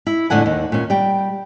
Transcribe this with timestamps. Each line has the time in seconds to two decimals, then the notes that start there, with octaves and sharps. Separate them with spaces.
0.06 E4
0.30 F2 A2 D3 A4 F#5 G#5
0.46 D#2
0.72 A#2 C#4
0.90 G3 G5